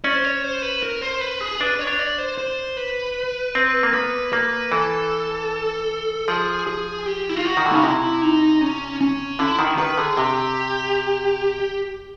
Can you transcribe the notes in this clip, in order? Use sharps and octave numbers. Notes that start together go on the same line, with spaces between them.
C#4 D5
C5
C#5
C5
B4
A#4
C5
B4
G#4
D4 B4
C#5
D4
D5
C5
C5
B4
C4
A#3
B3 B4
A#3 B4
E3 A4
F3 G#4
G#4
G4
E4
F4
F#4
D#3
D3
C#3 D#4
C3 E4
D#4
C#4
C#4
D3 E4
D#3
D#3 B4
D3 G#4
C3 G4